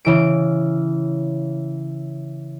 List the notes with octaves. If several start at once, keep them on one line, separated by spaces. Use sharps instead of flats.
C#3 E3 D7